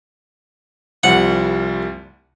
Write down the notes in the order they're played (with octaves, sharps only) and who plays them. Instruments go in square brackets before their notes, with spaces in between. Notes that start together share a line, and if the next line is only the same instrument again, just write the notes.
[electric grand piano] C2 F3 G3 [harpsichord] F#5